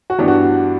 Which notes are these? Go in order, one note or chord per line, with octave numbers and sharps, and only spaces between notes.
F#4
G2 E3 B3 D4 G4
F#4